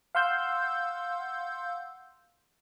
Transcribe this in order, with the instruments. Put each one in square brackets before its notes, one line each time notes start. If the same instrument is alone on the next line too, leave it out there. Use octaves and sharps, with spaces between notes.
[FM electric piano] F5 F#5 C6 E6 G6